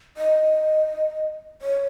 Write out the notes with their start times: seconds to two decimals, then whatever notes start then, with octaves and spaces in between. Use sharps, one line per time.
0.17 D#5
1.62 C#5